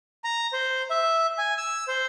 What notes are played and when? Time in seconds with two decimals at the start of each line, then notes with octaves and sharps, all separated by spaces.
0.24 A#5
0.53 C5
0.90 E5
1.38 G#5
1.58 E6
1.88 C5